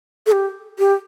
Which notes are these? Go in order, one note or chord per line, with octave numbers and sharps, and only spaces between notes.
A4
G4
G4